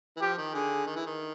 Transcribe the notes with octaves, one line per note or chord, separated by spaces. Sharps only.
E3
F3 G4
D#3
D3 G#4
D#3
E3
D#3